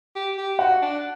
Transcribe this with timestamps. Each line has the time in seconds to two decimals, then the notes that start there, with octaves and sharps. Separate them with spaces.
0.16 G4
0.38 G4
0.59 F#4 F#5
0.82 D4